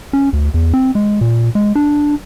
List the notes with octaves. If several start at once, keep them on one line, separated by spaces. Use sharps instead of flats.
C#4
D2
E2
C4
G#3
A#2
G#3
D4